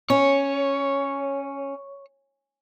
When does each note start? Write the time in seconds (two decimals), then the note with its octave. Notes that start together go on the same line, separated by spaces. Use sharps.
0.10 C#4 C#5